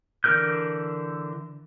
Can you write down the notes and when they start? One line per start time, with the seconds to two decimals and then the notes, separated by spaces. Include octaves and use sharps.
0.24 D3 E3 A#4 F6 G6